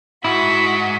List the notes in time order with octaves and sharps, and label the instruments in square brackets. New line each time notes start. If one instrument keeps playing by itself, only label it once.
[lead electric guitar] G#2 [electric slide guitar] E4 [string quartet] F#4 [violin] B6